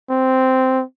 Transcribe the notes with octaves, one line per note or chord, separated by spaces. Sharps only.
C4